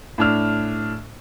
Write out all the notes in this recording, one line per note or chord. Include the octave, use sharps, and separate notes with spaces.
A2 D4 F6